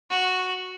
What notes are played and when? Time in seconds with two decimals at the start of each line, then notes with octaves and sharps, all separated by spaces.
0.10 F#4